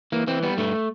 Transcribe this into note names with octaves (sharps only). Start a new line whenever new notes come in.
E3 A#3
E3 C4
G3 B3
G2 A3